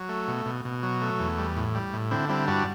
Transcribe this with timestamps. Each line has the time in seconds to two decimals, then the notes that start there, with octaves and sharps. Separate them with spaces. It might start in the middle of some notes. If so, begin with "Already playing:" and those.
Already playing: F#3
0.09 A3
0.28 B2
0.46 B2
0.65 B2
0.83 F#3
1.02 A3
1.19 E2
1.38 G3
1.56 A2
1.75 G3
1.93 A2
2.11 D3 C4 E4
2.29 G3 C4 E4
2.48 G2 D4 F#4